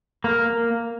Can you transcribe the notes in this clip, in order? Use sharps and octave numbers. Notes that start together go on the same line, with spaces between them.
A#3